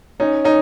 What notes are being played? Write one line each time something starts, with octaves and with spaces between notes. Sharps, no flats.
C#4 D#4
C#4 D#4